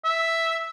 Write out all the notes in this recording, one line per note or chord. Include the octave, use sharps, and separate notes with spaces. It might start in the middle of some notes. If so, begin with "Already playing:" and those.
E5